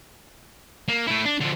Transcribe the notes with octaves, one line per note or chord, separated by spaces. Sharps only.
A#3
A3 E4
D4
D3 F3